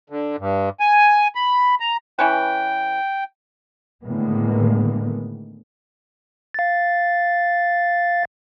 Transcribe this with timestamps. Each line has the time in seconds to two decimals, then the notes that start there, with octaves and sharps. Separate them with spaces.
0.10 D3
0.39 G2
0.80 G#5
1.35 B5
1.80 A#5
2.19 E3 C#4 B4 G5
4.04 A2 D3 D#3 G#3 A#3 B3
6.54 F5 A6